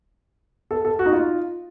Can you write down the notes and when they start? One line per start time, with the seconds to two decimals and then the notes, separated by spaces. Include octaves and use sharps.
0.71 A4
0.85 A4
0.99 F#4
1.06 D#4
1.12 F4